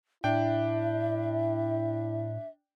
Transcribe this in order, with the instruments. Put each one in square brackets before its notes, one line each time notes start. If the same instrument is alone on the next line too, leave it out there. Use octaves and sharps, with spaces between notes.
[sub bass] A2 [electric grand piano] D4 G5 [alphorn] E4 [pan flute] E5